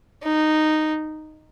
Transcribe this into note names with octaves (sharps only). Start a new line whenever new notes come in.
D#4